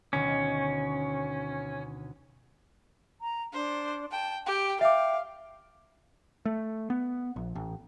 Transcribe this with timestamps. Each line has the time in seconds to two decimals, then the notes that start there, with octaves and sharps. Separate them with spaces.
0.13 D2 B2 D#3 C#4
3.21 A#5
3.53 D4 C5
4.11 G5 A5
4.46 G4 G5
4.81 E5 F5 G5 D6
6.45 A3
6.90 B3
7.36 A#1
7.55 A1